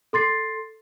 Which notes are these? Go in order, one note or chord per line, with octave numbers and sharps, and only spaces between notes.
A4 C6 A6 C7